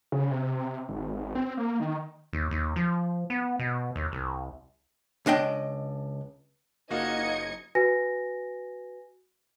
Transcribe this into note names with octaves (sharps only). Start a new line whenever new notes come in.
C#3
C3
C3
G#1
C4
A#3
D#3
D#2
D#2
F3
B3
B2
D#2
C2
C#2 D4 D#5 G5
F#1 A#3 D#4 F4 F#4 D#5 G#6 C#7
F#4 B4 G#5 A#6